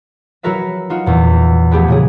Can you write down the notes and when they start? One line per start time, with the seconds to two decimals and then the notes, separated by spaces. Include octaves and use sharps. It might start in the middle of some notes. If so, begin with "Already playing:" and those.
0.43 F#3 E4 F#4 A#4 B4 E5
0.90 D#4 F4 F#4
1.06 E2 A#2
1.71 F3 A3 B3 G4 G#4 B4
1.88 A#2 C#3 G#4